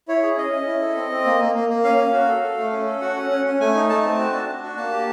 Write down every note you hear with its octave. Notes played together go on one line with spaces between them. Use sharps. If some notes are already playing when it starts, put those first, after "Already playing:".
E4 C#5
G#4
C#4 D#5
C#4
E4
A4
C4
C4
A#3
A#3
A#3
A#3
C#4 F5
C#4
F#4
A4
A4
A3
C#4
A4
F#4 F#5
C#4
C#4
C#4
A3 G#5
D#4
A3 A5
C4
F#4
D4
D4
F#4
A#3 A5
G4